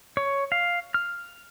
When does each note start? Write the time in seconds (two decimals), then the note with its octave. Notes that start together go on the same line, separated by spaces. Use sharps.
0.17 C#5
0.52 F5
0.94 F6